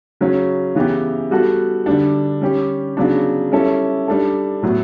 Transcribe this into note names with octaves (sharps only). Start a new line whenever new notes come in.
C#3 F#3 C#4
C#3 E3 B3 E4 G4
G3 B3 F#4 A4
D3 G3 D4
G3 C#4 G4
C#3 F#3 B3 D4
G3 C#4 E4 A4
G3 D4 A4
A2 F#3 B3